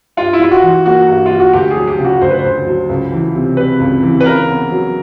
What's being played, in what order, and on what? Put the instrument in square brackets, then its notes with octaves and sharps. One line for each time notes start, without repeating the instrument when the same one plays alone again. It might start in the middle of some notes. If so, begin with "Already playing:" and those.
[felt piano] G2 [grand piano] F4
[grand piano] E4
[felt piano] G3 [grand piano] F4
[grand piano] F#4
[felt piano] E3
[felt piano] A#3 [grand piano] F#4
[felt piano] G2
[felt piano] G3 [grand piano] F4
[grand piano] F#4
[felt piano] D2 [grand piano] G4
[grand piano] G#4
[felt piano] F#3
[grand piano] G4
[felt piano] C#3
[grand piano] F#4
[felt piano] D2 [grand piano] C5
[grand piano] B4
C5
[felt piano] D2
F#3
C#2
E3
C3
[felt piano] G3 [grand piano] B4
[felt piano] C#2
E3
[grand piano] B4
[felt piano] C#3 [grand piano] A#4
[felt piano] B3
F#3